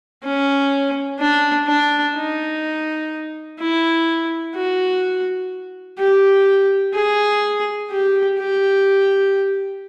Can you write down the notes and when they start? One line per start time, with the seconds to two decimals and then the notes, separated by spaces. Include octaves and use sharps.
0.24 C#4
1.20 D4
1.68 D4
2.16 D#4
3.59 E4
4.55 F#4
5.99 G4
6.95 G#4
7.91 G4
8.39 G4